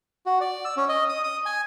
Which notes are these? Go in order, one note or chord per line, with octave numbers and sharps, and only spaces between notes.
F#4
D5
E6
C#4
D#5
D#6
D#6
G#5